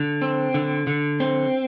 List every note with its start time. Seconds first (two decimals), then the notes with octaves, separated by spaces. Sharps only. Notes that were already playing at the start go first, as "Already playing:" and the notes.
Already playing: D3
0.22 C4
0.54 D3
0.87 D3
1.20 C4